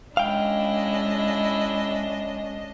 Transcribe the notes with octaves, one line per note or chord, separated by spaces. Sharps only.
G#3 C#4 D4 E4 D#5 F5 G5